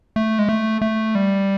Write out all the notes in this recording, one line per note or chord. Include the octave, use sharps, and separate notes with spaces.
A3
G#3
A3
A3
G3